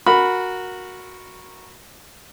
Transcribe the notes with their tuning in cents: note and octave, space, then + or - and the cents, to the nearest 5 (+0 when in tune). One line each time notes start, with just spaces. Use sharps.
F#4 -10 A#4 +0 B5 +0